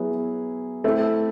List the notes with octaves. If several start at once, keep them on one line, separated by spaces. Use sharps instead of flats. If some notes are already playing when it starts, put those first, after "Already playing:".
Already playing: F#3 B3 E4 G#4
A3 C4 E4